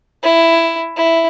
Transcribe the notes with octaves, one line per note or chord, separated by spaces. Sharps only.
E4
E4